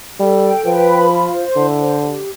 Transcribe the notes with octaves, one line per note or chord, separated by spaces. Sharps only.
G3 A4
G5
F3 B4
B5
F4
C5
D3 E4
C5
G4